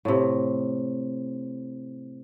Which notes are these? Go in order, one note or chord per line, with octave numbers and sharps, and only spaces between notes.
A2 C3